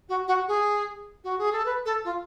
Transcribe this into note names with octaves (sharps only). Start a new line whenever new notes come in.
F#4
F#4
G#4
F#4
G#4
A4
B4
A4
F4